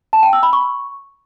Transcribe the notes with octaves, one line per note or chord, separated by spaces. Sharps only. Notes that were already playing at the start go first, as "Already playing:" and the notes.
A5
G5
E6
B5
C#6